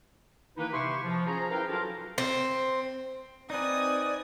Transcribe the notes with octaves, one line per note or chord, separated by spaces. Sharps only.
D#3 E3 A#3 D#4 E4 B4
C3 E4 G4 C6 C#6
F3
C#4 F4 G#4 C5 A#5
E4 A#4 B4 F5 G5
F#3 D4 F4 F#4 A4 A#4
C4
C4 D#4 B4 D5 G#5 D#6